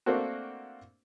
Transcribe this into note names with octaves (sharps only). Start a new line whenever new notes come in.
A3 A#3 C4 D4 F#4